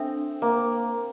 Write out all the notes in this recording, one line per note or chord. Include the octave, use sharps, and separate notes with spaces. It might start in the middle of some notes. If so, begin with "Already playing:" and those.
Already playing: C4 D4 A4 E5
A#3